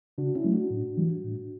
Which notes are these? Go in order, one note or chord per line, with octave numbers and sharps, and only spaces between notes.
C#3 D4 F#4
C#4 E4
F#3 A3
D4 F#4
A2
E3 G3
A2